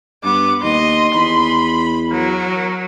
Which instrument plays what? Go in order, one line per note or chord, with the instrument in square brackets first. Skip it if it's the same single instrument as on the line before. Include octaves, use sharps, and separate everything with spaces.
[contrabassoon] G2 [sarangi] B3 [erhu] D6
[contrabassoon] D#2 [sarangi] D#5 [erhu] C6
[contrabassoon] E2 [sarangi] B5
[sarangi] F#3 [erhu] A#4